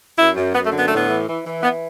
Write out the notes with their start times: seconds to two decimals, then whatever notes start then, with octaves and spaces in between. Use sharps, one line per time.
0.17 F#2 E4
0.36 F#2
0.54 F#2 B3
0.66 A3
0.72 D3
0.78 B3
0.87 A3
0.91 A2 B3
1.08 E3
1.28 E3
1.45 E3
1.63 E3 B3